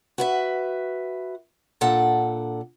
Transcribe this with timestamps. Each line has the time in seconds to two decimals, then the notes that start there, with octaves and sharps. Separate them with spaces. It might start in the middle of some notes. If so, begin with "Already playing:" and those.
0.18 F#4 B4 E5
1.81 A#2 D4 A4 F#5